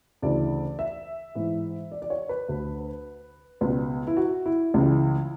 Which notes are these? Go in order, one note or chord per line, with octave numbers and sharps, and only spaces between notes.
D2 C#3 E3 D5
E5
G#2 E3
D5
D5
C#5
B4
D2 D3
C#2 B2 B4
E4
F#4
E4
C#2 C#3 E3